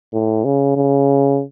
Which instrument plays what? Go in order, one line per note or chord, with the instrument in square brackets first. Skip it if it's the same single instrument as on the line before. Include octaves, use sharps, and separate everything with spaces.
[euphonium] A2
C#3
C#3